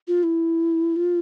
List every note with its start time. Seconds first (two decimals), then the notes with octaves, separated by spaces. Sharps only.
0.08 F4
0.23 E4
0.96 F4